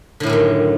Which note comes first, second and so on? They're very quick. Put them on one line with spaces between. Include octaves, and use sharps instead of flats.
D3 A2 G3 F#2 D#3